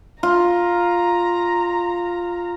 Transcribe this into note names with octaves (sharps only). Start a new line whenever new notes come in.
F4 A#5